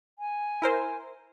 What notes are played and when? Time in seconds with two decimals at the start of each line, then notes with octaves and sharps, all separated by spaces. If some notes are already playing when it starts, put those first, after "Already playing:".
0.19 G#5
0.62 E4 A#4 C5